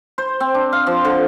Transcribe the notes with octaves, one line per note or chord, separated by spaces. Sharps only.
C5
C4
D4
F5
F3
D3